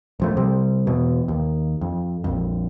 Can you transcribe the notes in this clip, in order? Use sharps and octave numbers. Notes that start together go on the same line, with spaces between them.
D1 F3 A3
C3 G3
E2 B2
D#2
F2
A#1 F2